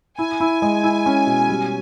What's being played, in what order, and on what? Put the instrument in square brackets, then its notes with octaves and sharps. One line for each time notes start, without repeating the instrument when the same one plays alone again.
[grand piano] E4 [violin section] G#5
[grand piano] E4
G#3
E4
C#4
B2
G3